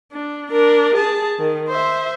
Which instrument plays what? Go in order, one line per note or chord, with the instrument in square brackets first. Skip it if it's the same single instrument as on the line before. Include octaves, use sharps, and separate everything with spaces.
[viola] D4
D4 A#4
G#4 A5
D#3
C5 E5